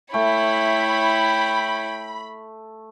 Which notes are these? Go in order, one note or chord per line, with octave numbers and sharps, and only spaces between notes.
A3 E4 C#5 G5 B5